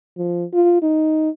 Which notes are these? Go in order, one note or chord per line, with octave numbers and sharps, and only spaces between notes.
F3
F4
D#4